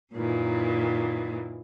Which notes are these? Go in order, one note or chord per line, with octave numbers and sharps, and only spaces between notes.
F#2 A#2 D#3 E3